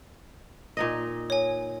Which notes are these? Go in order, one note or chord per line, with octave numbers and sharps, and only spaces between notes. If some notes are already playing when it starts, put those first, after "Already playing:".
A#2 D#4 D#5
C#5 G#5